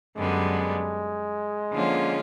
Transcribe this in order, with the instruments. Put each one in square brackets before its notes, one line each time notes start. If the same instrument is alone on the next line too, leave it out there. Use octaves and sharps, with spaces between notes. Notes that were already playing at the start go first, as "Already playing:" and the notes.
[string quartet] F#2 D3 G3 B3 [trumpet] G#3
[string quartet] D3 F3 A#3 C#4 F4